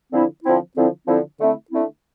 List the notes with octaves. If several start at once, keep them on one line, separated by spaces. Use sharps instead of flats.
D3 F3 C4 E4
D3 F3 C4 E4
D3 F3 C4 E4
D3 F3 C4 E4
D3 A3 C4 E4
D3 A3 C4 E4